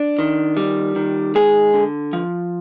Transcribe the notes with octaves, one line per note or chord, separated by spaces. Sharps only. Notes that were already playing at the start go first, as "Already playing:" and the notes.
Already playing: D4
D#3
G3
D#3
G#3 G#4
D3
F3